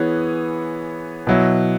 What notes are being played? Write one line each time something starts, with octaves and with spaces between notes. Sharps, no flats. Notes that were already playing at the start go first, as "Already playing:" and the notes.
Already playing: E3 B3 G#4 C#5
B2 F#3 E4